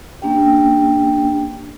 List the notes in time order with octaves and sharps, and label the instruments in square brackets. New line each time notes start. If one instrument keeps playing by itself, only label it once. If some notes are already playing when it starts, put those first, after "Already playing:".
[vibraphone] A#3 C#4 D4 G4 G5